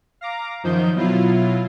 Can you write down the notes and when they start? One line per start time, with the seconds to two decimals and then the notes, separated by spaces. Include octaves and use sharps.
0.21 F5 A#5 D6
0.63 F#2 D#3 F3 D#4 G6
0.96 B2 F#3 E4 F4